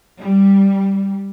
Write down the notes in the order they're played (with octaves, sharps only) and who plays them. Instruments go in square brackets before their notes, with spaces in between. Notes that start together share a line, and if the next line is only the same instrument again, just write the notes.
[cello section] G3